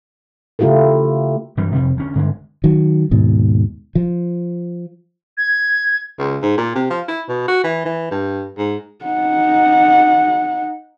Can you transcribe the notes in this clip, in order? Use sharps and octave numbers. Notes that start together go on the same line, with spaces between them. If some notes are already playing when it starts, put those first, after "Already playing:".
C#3 A3 E4 F4 G4 A#4
G2 E3 F#3 G3
F2 C3 G3
D2 C#4
G2 D3 G#3
D#3 F#3
D#2 G#2 B2
F3
G#6
C#2
G#2
A#2
C3
F3
E4
B2
F#4
E3
E3
G2
G#2
D#4 F#5